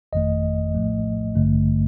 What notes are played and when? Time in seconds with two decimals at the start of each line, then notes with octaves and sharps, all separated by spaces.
0.13 G1 F2 D#3 A3 D#5
0.75 A#1 A2 F3 A3
1.36 A1 G2 D3 A3